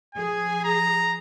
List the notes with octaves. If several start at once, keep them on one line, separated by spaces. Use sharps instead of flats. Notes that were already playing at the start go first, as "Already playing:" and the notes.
F3 G#4 G#5
A#5